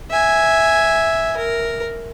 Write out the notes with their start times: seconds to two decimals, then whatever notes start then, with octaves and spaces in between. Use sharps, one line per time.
0.10 E5 G#5
1.37 A#4